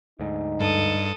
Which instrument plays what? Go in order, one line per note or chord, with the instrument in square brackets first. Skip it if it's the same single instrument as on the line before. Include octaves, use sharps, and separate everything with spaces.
[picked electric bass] D2 G#2 [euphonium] D#4
[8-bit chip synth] G2 [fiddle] A4 D#6